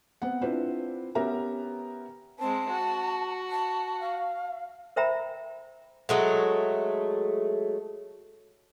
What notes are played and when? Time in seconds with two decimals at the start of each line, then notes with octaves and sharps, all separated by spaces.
0.22 B3 C4 F#5
0.41 C4 D4 E4 F4 B4 C5
1.15 B3 C#4 G4 A#4 E5 A#5
2.39 G#3 C4 A5
2.69 F#4
3.50 A5
4.00 F5
4.96 A#4 C5 E5 G5 A#5 B5
6.09 F#3 G#3 A3